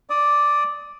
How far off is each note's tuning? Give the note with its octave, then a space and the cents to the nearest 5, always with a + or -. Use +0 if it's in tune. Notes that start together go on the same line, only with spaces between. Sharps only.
D5 +0 D#6 +20